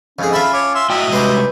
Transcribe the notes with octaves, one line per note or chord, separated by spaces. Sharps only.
F2 G#2 C#4 G#4
F4 E5 A5 B5
C#5 D6
E5 C6 E6
A2 F#3 D#5 E5 G5
C3 G3 G#3 B4 C5 D6